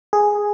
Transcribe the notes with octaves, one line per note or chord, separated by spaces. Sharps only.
G#4